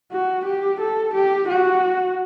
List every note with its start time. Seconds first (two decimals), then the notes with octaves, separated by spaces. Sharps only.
0.12 F#4
0.46 G4
0.81 A4
1.14 G4
1.49 F#4